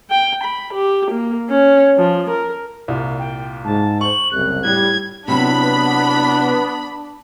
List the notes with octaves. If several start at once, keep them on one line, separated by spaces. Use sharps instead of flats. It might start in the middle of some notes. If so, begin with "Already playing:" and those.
G5
B5
G4
A#3
C#4
F3
A#4
C2 A#2
G5
G#2 A5
C5 C#6 F#7
F#1 C2 F#6
A2 G3 G#6
C3 F#3 B3 D4 E4 B5